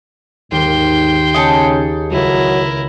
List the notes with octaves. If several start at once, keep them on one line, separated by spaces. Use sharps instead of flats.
D#2 G#2 G5 C6
C#3 D#4 G#4 A5
C#2 F#3 E4 A#4